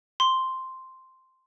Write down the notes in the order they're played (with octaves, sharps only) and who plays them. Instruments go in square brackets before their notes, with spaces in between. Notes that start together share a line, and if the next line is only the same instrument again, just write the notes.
[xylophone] C6